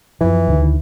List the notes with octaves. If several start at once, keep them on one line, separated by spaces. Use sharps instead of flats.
F#2 E3 F3
D2 D3 D#3